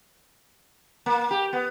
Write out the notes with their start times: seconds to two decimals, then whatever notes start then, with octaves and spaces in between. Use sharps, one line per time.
1.06 A#3
1.31 G4
1.53 B3